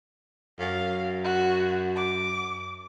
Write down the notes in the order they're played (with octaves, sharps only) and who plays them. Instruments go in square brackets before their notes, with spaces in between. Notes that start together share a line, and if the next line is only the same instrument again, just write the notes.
[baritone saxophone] F#2 [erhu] F5
[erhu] F#4
D6